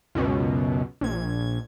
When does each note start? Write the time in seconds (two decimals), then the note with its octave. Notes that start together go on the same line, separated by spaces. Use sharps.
0.15 C#2 F#2 B2
1.01 A#1 G#6